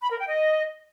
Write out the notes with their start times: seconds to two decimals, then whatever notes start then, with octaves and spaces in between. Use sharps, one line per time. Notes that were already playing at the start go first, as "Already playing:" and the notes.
0.01 B5
0.10 A#4
0.19 G5
0.28 D#5